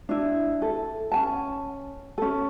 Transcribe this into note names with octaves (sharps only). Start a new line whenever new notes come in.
D4 E4
A4
C#4 G#5 A5
C#4 A4